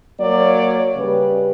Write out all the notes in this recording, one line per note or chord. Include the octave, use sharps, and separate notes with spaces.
F#3 A#3 C#5 D5
C#3 G3 B4